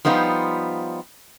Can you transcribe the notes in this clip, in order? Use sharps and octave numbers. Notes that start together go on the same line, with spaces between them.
F3 G3 B3 D#4 F4